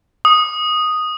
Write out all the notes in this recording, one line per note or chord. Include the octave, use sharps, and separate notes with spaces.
D#6